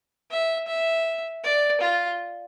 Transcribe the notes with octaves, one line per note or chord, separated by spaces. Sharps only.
E5
E5
D5
F4